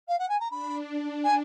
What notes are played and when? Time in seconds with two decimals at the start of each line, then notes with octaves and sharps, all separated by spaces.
0.08 F5
0.18 F#5
0.28 G#5
0.40 A#5
0.50 D4 B5
1.23 G#5